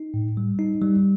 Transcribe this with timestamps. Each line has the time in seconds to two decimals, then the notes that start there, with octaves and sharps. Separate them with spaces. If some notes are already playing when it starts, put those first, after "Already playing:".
Already playing: D#4
0.14 A2
0.37 G3
0.59 D#4
0.82 G3